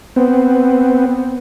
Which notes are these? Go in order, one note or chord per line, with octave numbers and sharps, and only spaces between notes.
B3 C4